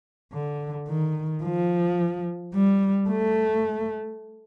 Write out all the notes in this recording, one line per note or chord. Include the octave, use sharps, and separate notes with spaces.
D3
D#3
F3
G3
A3